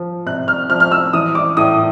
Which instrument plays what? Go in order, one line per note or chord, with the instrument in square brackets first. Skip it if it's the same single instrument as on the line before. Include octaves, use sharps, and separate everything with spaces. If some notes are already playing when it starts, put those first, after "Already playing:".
Already playing: [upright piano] F3
C3 F#6
F6
F3 F6
F6
E6
E3 D#6
D6
A2 D#6